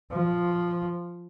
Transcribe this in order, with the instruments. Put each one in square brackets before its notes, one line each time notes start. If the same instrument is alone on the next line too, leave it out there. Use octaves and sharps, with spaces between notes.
[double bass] F3